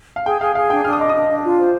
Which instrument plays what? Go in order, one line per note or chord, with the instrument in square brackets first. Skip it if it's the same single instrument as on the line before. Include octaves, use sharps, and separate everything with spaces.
[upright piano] F5
[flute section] G#4 [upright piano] G5
[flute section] G#4 [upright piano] F5
[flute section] G#4 [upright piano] F5
[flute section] D4 [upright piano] G5
[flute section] D4 [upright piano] F6
[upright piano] D#6
[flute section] D#5 [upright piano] D6
[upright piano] D#6
[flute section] D4
D4
F4
C5